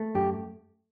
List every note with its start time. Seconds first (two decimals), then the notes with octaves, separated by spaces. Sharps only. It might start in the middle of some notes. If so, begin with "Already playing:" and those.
Already playing: A3
0.15 F#2 G4